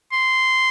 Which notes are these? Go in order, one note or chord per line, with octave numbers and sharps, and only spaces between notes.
C6